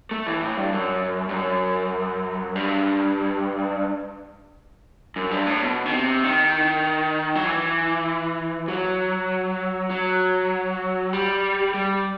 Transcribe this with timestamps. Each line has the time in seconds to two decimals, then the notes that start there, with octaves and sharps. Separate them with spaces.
0.11 A3
0.27 E3
0.42 A2
0.57 G2
0.72 F#2
1.29 G2
1.33 F#2
2.56 G2
5.16 F#2
5.31 G2
5.47 A2
5.62 B2
5.86 D#3
5.92 C3
6.24 D#3
7.35 F#3
7.46 E3
8.68 F#3
9.90 F#3
11.13 G3
11.74 G3